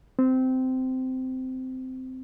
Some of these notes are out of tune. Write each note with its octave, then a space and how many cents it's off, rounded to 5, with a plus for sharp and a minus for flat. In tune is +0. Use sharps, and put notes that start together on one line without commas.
C4 -15